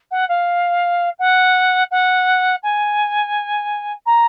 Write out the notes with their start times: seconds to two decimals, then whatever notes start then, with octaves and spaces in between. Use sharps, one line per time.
0.11 F#5
0.28 F5
1.18 F#5
1.90 F#5
2.63 G#5
4.06 A#5